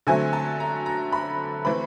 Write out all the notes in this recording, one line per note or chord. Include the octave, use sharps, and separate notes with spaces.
D3 F#3 A3 C4 G#5
A5
A#5
A#5
B5
E3 A3 C4 B5